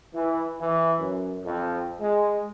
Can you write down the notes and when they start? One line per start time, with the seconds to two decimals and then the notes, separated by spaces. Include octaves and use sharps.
0.14 E3
0.60 E3
1.00 F#2
1.44 F2
2.00 G#3